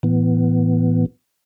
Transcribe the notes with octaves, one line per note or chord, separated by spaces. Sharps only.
A2 E3 B3